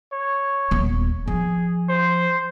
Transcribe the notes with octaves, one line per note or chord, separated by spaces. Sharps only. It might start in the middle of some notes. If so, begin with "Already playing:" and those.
C#5
D#1 B3
F3 G#4
C5